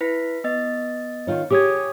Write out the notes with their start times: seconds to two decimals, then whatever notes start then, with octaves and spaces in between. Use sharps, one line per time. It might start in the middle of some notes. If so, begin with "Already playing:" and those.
0.01 E4 B4 B6
0.44 B3 D#5 A6
1.27 D#3 F4 C#5
1.51 G4 G#4 C#5 D6 D#6 G#6